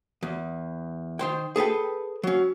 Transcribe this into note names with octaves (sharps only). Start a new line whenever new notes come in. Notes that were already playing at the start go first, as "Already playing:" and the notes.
E2
D#3 C5 G5
G#4 A4 B4 G5
F#3 C#4